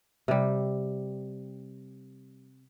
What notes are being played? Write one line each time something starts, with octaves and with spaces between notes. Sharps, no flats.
C3 G3